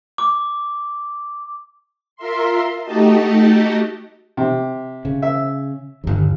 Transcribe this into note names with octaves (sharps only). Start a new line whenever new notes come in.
D6
F4 A#4 E5 C6
A3 D#4 F#4 G4 D#5 A5
C3
C#3
E5
G1 D#2